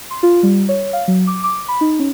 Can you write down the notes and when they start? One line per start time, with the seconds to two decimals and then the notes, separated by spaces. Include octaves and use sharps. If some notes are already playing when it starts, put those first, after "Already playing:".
0.11 C6
0.23 F4
0.43 G3
0.69 C#5
0.93 F5
1.08 F#3
1.27 D6
1.44 D6
1.68 B5
1.81 D#4
1.99 C#4